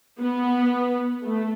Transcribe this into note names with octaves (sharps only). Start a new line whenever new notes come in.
B3
A3